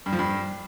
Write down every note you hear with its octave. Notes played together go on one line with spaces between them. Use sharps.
G2
F3
G2